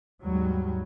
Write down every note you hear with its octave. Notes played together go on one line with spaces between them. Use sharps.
D#2 G#2 F#3 G3